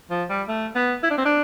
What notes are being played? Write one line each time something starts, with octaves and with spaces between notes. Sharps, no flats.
F3
G3
A3
B3
E4
D4
C4
D4